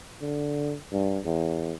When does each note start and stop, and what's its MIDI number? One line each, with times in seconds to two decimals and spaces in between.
0.22 0.75 50
0.92 1.19 43
1.25 1.73 40